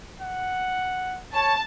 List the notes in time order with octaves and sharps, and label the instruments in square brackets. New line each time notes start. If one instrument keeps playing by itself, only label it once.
[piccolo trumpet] F#5
[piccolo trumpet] C#5 [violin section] A5